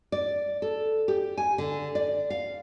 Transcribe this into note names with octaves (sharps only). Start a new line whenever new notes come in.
D5
A4
G4
G#5
D3
D5
F5